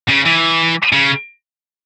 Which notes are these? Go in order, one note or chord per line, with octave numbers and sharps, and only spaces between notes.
C#3
E3
C#3